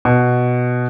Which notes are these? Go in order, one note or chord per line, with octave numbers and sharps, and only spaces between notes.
B2